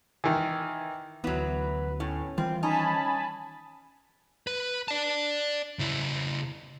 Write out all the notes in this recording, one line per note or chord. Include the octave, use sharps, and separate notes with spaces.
D#3 E3
D2 E3 F#3 B3 B4
A2 C#4
D#3 E3 G3 C4 F4
C#4 D#4 G#5 A5 B5
B4
D5 A5
C#3 E4